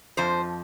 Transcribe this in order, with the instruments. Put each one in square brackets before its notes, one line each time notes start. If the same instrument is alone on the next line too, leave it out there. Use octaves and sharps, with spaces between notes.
[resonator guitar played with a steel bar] F2 F3 C5